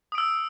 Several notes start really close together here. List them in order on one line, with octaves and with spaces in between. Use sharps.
D#6 D7 E6